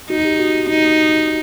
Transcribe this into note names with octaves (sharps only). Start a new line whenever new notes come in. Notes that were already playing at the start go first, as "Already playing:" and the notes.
D#4 F#4
G4
F#4
D#4